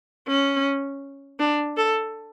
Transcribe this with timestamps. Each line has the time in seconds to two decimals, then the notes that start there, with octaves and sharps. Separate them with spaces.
0.28 C#4
1.40 D4
1.77 A4